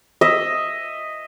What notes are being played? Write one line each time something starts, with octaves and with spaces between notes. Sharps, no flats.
D#5 E5